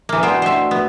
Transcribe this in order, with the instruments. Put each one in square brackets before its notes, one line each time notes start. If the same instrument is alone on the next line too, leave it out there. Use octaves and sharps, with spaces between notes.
[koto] E3 A#3
[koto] B3 C5 G5 [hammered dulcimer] D4 F#4
[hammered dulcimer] A3 D#5 [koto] C5 E5
[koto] B3